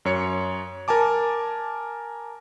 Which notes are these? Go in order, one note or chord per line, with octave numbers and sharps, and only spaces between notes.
F#2 C#5 C#7
A#4 G#5 A5 D6